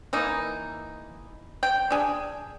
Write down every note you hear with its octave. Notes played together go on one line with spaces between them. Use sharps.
E3 A#3 D#4
G5
D4 G#4